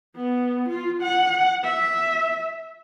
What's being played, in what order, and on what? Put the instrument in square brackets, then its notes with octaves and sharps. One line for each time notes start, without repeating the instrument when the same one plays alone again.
[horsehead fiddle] B3
F4
F#5
E5